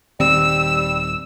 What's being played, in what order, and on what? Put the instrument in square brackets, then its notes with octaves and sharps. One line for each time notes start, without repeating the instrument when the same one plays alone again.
[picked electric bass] D#1 D#3 C4 [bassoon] G3 [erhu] E6